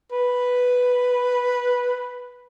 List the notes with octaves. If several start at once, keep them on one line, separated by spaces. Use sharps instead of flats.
B4